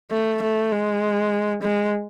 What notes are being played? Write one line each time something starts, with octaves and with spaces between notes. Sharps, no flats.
A3
A3
G#3
G#3